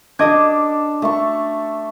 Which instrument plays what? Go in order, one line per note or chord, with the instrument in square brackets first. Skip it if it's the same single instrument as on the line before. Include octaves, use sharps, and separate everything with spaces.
[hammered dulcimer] D4 A4 [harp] D#5 D6 G#6
[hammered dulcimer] A3 C#6